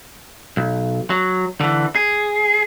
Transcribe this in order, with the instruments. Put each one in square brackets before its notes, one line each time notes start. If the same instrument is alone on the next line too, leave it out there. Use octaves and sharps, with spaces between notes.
[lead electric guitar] B1
F#3
D3 E3
G#4